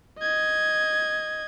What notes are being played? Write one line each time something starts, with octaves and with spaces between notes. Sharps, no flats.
D#5 G#6